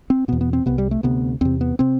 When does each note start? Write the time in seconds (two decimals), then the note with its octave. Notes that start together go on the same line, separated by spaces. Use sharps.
0.10 C4
0.28 B2 B3
0.33 E2
0.41 B3
0.53 C4
0.66 C2 C3 B3
0.78 G3
0.91 A3
1.03 D2 C3 B3
1.41 E2 C3 C4
1.61 B3
1.79 C3 C4